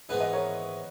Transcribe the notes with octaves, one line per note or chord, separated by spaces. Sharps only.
G#2 E3 B3 D#4 G#4 B4
B4 D#5
A#4 C#5